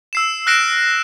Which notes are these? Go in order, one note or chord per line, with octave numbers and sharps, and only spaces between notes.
E6 C7 E7
F6 F#6 A#6 C7 D7 E7